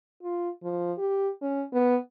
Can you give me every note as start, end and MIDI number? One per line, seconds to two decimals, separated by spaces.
0.23 0.49 65
0.63 0.92 53
0.98 1.29 67
1.42 1.64 61
1.73 1.96 59